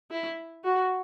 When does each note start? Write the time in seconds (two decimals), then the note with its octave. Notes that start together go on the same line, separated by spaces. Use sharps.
0.11 E4
0.64 F#4